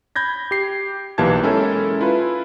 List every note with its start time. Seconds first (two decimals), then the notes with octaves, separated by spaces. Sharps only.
0.16 B5 G6 G#6 A#6
0.51 G4 C7
1.18 B1 E3 A#3 G4 A5 G#6
1.43 G#3 C#4 E4 A4 A#4
2.01 E4 F4 B4